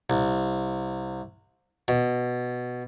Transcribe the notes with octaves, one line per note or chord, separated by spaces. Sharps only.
C2
B2